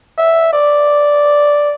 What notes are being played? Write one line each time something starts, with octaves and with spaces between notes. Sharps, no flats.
E5
D5